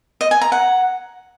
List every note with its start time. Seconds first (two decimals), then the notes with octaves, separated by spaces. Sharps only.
0.21 D#5
0.31 G#5
0.41 A#5
0.52 F#5